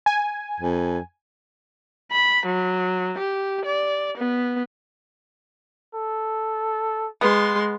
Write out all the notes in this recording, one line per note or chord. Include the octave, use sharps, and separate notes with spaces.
G#5
F2
B5
F#3
G4
D5
B3
A4
G#3 B3 C6